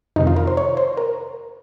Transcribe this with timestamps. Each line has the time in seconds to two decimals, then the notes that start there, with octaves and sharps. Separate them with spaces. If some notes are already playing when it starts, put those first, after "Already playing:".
0.16 F2 C3 D#3 D#4
0.27 F4
0.36 A#4
0.47 C5
0.57 C#5
0.77 C5
0.97 A#4